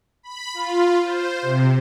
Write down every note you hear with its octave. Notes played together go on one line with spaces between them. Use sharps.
B5
F4
C5
C3